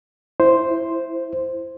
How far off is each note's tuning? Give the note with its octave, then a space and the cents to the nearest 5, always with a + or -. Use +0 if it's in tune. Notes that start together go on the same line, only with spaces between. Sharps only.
E4 +5 C5 +0